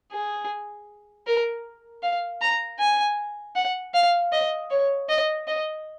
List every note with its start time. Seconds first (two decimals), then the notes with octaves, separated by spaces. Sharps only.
0.12 G#4
1.27 A#4
2.03 F5
2.41 A#5
2.79 G#5
3.55 F#5
3.94 F5
4.32 D#5
4.70 C#5
5.09 D#5
5.47 D#5